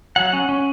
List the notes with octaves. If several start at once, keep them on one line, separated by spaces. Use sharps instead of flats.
F#3 F#5
C#4
C#4